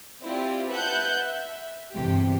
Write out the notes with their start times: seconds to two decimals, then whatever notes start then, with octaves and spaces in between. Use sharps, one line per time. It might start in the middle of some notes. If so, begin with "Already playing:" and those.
0.23 C4 E4 F4 G4 D5
0.71 B4 E5 F#5 A5 F#6 G6
1.14 E5
1.93 G1 E2 C3 E3 G4